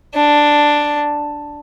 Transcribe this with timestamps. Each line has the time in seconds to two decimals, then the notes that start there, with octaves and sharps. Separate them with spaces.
0.14 D4